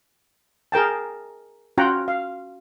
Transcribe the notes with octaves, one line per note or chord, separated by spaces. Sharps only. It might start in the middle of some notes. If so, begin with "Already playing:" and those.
G#4 A#4 G5 A5
C#4 F4 F#4 F#5 G5 A#5
F5